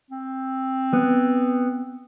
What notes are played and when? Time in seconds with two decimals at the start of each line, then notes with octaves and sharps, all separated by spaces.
0.11 C4
0.93 B3